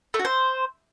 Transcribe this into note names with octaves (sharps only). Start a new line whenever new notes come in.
A3
F#4
C5